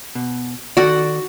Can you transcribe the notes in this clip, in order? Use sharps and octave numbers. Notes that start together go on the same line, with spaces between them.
B2
D#3 F#4 A4 D5 F#5